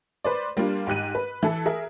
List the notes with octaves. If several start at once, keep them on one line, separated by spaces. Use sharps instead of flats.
B4 C5 D5
G3 A#3 D4 F4
G#2 G4 F#6 D#7
B4
E3 E4 A4
G#4 A#4 E5